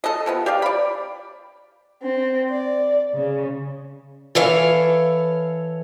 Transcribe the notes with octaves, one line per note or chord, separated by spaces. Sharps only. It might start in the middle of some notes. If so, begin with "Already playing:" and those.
A4 D#5
C3 F3 B3
G4 D5 F5
D5 B5
C4
D5
C#3
E3 A4 C#5 F5